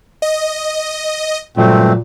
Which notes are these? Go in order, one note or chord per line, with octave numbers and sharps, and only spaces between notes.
D#5
C#2 G2 A#2 F#3 A3 C4